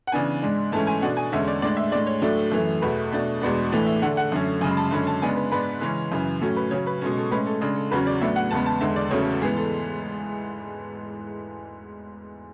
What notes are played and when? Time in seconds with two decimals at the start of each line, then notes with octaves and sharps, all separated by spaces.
0.07 F#5
0.12 C#3 E3 B3 D4 G#5
0.42 G#2 G#3 D4
0.72 G#2 E3 A3 C#4 A5
0.87 G#5
1.02 B2 A3 D4 F#5
1.17 G#5
1.32 E2 D3 G#3 C#4 E5
1.48 D5
1.62 A2 G#3 D4 D5
1.77 E5
1.92 A2 G#3 D4 D5
2.07 C#5
2.22 A2 F#3 A3 D4 A4
2.52 F#2 E3 A3
2.82 E2 B2 A3 B4
3.12 B2 A3 D4
3.41 E2 B2 G#3 B3 D4
3.72 A2 E3 A3 D4 D5
3.86 E5
4.01 D3 A3 D4 F#5
4.17 F#5
4.32 F#2 D3 A3 C#4
4.61 F#2 G#5
4.64 C#3 G#3
4.71 B5
4.77 A5
4.91 F#2 D3 G#3 C#4 B5
5.07 A5
5.22 C#3 G#3 B3 D4 G#5
5.36 B4
5.51 G#2 G#3 B3 D4 B4
5.81 C#3 E3 G#3 C#4
6.12 F#2 C#3 E3
6.41 A2 F#3 C#4 A4
6.57 B4
6.71 C#3 F#3 C#4 C#5
6.87 B4
7.01 B2 G#3 C#4 A4
7.17 A4
7.31 A2 G#3 C#4 B4
7.46 A4
7.61 C#3 G#3 D4
7.76 A4
7.91 E2 C#3 F#3 C#4 B4
8.07 D5
8.22 A2 F#3 B3 D4 E5
8.36 F#5
8.51 E2 C#3 G#3 B3 A5
8.66 A5
8.81 E2 D3 G#3 E5
8.96 D5
9.11 E2 C#3 F#3 A3 C#4 C#5
9.21 A4
9.31 A4
9.42 G#2 E3 B3 G#4
9.57 A4